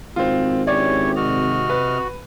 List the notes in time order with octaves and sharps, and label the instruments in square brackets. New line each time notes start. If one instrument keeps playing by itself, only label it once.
[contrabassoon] G#1 [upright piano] C4 F4
[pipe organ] C#4 E4 G4 [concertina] C#5 [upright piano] D5
[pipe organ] C3 D#5 F6 [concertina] F#4
[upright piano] B4